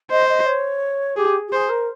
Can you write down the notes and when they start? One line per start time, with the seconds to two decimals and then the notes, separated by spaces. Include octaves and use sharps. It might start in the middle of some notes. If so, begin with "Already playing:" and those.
0.11 C5 D#5
0.29 D#5
0.46 C#5
1.17 G4 G#4
1.48 G4
1.52 G#4 C5
1.69 A#4